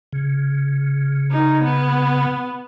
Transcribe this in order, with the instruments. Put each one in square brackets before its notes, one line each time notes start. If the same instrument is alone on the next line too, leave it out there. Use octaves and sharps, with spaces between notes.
[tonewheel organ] C#3
[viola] D#4
B3